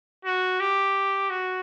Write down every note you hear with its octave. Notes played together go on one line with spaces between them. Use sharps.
F#4
G4
F#4